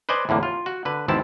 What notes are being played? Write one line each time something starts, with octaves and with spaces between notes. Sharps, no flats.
B4 C5 D5 D#5 G#5
E2 A2 D3 A#3
F4
F#4
D3 B4
G#1 E2 C4 E4 A5